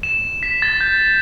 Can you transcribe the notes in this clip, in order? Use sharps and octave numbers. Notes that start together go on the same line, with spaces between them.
E7
B6
A6
G6